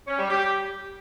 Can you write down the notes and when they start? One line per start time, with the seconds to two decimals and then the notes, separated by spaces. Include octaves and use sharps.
0.07 C#4
0.19 G3
0.30 G4